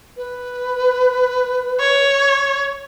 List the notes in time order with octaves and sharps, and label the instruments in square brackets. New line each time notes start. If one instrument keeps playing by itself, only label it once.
[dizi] B4
[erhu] C#5